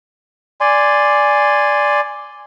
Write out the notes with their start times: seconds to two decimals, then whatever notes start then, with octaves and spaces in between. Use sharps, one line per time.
0.61 D5 G#5 C6